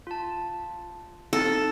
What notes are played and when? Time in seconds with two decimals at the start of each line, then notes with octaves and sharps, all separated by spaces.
0.07 F4 A5
1.33 C4 D#4 A4